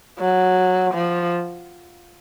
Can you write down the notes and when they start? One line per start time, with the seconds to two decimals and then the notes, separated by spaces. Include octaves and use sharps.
0.19 F#3
0.94 F3